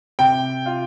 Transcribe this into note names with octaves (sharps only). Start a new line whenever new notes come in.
C3 G5
F4